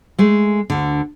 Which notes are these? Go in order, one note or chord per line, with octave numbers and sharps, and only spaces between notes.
G#3 A3
D2 D3